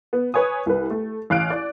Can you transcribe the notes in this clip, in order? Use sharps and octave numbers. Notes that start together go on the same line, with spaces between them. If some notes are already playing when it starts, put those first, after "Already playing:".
B3
B4 C#5 G#5 D#6
C2 B4
A3
A1 F5 F#6 D7
D5